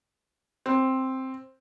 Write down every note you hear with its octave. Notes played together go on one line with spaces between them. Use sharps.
C4